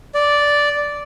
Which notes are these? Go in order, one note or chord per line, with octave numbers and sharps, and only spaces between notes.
D5